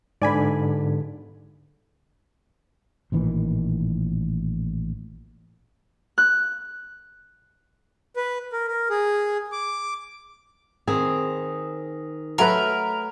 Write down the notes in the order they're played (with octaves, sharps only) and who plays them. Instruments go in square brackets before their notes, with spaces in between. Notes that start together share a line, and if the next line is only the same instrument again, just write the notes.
[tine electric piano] G#2 D3 [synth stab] D5 G#5 B5
[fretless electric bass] A1 A#2 D#3 E3
[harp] F#6
[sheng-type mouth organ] B4
A#4
A#4
G#4
D6
[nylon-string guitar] D#3 C4 G#4
[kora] F#3 A3 B4 [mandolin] A#4